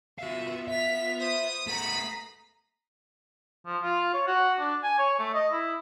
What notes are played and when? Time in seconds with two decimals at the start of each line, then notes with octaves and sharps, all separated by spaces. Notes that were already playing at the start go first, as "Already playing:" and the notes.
0.18 B3 F4 F#4 E5 F5
0.68 E5 B6 F7
1.21 C5 B5 D#6
1.67 A3 B3 A#5 B5 D#6 B6 C7
3.66 F3
3.83 F4
4.14 C#5
4.27 F#4
4.59 D4
4.83 G#5
4.99 C#5
5.19 A3
5.34 D#5
5.52 E4